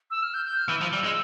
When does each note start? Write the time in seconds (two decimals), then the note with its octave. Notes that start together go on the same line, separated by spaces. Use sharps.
0.11 E6
0.23 F6
0.34 G6
0.46 G6
0.57 F6
0.69 E3 E6
0.81 F3
0.93 G3
1.04 G#3